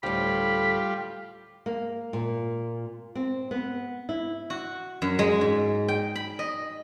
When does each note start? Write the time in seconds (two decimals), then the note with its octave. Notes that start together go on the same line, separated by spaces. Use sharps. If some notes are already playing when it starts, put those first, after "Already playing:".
0.03 D2 A2 G3 F4 G4 B5
1.66 A#3
2.13 A#2
3.15 C4
3.51 B3
4.09 E4
4.50 F#4
5.02 F#2
5.19 G#3
5.41 G#2
5.88 G5
6.15 B5
6.39 D#5